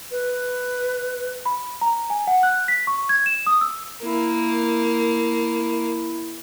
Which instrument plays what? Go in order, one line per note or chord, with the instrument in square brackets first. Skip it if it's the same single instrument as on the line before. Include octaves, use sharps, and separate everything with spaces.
[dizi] B4
[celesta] B5
A#5
G#5
F#5
F#6
B6
C#6
G#6
E7
D#6
E6
[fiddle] A#3 [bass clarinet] E4